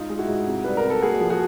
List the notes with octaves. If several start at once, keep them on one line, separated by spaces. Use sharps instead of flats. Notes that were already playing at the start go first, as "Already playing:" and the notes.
Already playing: G#2 D#4 F4
G#3
E4 F#4
G#2
C3
G3 B4
A#4
C3
A4
A#3 F#4 G#4
F3
F#4 G#4